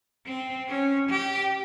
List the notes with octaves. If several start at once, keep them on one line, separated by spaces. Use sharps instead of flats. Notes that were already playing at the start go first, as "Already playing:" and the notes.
C4
C#4
G4